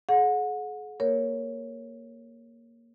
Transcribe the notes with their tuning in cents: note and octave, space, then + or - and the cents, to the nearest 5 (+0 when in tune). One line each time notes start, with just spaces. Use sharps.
G#4 +40 F#5 -30
A#3 +0 A#4 +0 C#5 +0